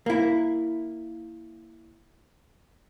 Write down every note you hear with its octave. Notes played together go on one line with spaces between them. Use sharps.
A#3 E4